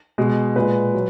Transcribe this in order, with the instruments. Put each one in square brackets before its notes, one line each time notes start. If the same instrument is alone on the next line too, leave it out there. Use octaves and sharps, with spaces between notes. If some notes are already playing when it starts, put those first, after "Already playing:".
[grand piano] B2 G#3
A#2 G#3 B4
F#3